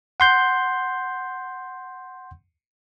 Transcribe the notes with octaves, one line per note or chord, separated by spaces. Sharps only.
F#5 C6 G6